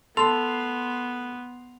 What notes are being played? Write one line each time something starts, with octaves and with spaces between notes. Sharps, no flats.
B3 A4 C6 F7